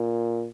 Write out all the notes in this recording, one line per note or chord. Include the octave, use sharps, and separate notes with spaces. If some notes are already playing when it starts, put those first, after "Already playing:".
Already playing: A#2